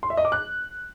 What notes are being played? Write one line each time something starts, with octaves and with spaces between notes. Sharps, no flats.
C6
E5
D#5
D6
F#6